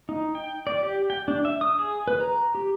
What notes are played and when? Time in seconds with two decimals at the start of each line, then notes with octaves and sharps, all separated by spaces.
0.09 D#4
0.35 G5
0.67 D5
0.83 G4
1.10 G5
1.28 D4
1.45 E5
1.61 D#6
1.79 G#4
2.08 B4
2.20 A#5
2.55 G4